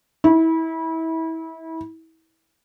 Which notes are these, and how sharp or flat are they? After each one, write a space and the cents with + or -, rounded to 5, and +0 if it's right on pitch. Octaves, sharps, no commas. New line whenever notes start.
E4 -25